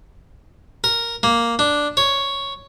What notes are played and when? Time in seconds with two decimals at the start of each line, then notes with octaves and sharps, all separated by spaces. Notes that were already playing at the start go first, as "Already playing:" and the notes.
0.84 A#4
1.23 A#3
1.59 D4
1.97 C#5